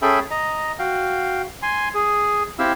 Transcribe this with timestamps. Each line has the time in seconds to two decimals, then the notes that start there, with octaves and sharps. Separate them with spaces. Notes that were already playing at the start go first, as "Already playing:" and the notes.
0.02 C#4 G#4 A4 E5 G5 B5
0.31 D#5 A#5
0.79 F#4 F5 G5
1.62 G#5 C6
1.95 G#4
2.59 C4 E4 G4 F5 E6